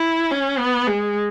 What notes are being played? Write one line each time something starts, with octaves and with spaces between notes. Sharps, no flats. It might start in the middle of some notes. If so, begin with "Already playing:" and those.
Already playing: E4
C#4
B3
G#3